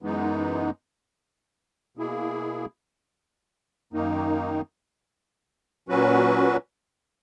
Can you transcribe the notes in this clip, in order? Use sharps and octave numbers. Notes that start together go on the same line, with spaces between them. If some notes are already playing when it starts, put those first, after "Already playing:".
F#2 E3 G#3 B3 D#4
B2 A#3 E4 G#4
F#2 D#3 A#3 D#4
A#2 F#3 C#4 F#4 B4